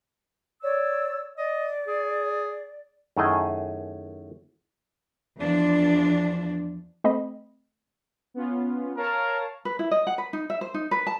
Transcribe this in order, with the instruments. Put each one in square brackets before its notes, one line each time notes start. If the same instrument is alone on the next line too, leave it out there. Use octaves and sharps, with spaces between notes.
[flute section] C#5 D5 E6
[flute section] D5 [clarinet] D#5
[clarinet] G#4
[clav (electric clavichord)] F#2 D#3 A3 E4 G#4 D#5
[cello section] E2 F3 D4
[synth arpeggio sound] A3 C4 D#5 B5
[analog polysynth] B3 C#4 F4
[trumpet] A#4 [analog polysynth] C#5 F5 A5
[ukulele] B4
E4
D#5
F#5
B4
D#4
E5
C5
D#4
B4
A5